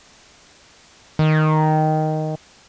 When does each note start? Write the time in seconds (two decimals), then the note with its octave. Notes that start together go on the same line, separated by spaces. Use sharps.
1.19 D#3